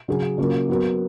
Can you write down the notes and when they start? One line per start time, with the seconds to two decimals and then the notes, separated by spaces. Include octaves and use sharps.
0.08 C#3 F#3 C#4 G#4
0.38 C#3 F#3 A#3 C#4 F4
0.69 F#3 B3 F#4 A#4